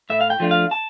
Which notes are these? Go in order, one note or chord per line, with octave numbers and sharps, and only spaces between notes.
A2 E5
F5
G5
F3 A3 D4 F4
F5
A5